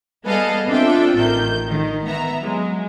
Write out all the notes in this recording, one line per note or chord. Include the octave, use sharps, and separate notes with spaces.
G3 B3 G#4 A4 D#5 F5
C4 D4 F4 A4 E5 G5
A1 D#3 G6
D#3
B3 E5 A#5
F#3 G#3